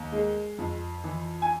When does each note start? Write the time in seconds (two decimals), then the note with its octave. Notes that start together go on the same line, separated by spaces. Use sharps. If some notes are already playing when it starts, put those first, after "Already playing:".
Already playing: D#2
0.12 G#3
0.58 F2
1.04 E3
1.42 G#5